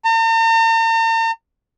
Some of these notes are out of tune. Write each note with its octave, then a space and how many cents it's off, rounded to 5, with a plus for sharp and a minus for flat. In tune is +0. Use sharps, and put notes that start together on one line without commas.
A#5 -45